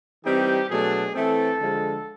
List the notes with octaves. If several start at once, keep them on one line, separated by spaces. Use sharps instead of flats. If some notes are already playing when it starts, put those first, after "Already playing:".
E3 G3 C4 D#4 G4
B2 F#3 A3 D4 G#4
E3 A3 C4 A4
D3 F3 G#3